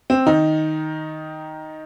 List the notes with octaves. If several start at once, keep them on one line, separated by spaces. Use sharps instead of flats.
C4
D#3 D#4